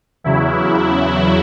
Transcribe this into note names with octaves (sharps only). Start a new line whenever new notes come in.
E2 C#3 F#3 E4